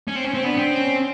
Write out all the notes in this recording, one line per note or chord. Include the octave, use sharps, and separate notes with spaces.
C#4
C4
C#4
C4
B3 D4
C4
C#4